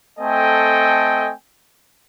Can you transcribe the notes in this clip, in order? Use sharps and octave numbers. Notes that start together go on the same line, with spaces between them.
A3 C4 A4 D#5 G5 G#5